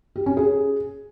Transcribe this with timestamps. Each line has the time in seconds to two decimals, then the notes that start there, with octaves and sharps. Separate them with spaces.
0.16 G4
0.26 C#4
0.37 G#4